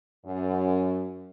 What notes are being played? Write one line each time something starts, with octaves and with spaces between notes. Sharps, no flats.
F#2